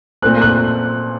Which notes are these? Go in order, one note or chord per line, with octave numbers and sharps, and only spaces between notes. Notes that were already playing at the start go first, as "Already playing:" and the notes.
A#2 A3 C4 F#6
F#6